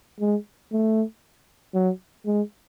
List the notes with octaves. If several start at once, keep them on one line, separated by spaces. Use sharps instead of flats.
G#3
A3
F#3
G#3